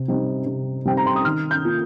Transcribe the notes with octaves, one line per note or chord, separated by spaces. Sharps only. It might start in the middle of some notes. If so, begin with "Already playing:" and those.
Already playing: C3
G3 C4 D#4
C3
G3 C4 D#4 G5
A#5
C6
D#6
D#3 F6
G6
A#3 F4